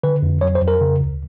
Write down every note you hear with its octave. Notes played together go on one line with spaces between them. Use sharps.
D3 B4
F2
F#3 C#5
C5
F2
A#4
C#3
D2